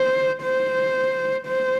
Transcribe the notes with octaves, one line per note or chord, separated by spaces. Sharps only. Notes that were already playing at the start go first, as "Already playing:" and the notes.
Already playing: C5
C5
C5